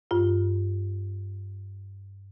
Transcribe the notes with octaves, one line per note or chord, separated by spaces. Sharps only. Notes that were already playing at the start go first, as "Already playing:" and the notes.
G2 F4